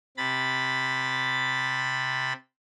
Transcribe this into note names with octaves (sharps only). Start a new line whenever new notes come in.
C3 B5 A6